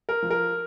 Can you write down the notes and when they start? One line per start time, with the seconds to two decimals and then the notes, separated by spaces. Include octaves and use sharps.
0.09 A#4
0.22 F3
0.30 A#4